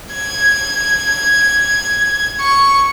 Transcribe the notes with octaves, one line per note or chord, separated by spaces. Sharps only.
G#6
C#6